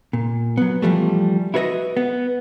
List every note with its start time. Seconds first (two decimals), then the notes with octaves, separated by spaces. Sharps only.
0.13 A#2
0.57 F#3 B3
0.82 E3 F3 G3 A3
1.54 E4 F#4 B4 C#5 D#5 E5
1.97 B3